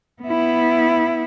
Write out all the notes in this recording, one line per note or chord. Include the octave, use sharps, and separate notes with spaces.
B3 E4